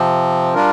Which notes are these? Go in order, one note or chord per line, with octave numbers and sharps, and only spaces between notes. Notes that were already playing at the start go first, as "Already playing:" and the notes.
Already playing: C3 F3 C4
G3 D4 F4 A#4